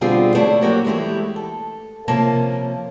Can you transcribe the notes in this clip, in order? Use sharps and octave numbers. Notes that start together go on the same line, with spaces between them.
B2 D3 G3 C4 F4 G#4
F3 A3 C#4 E4 C5 D5
F#3 A#3 F#4 G4
E3 G#3 A3 E4 G4
A4
C3 F3 A#3 C#4 A#4 A5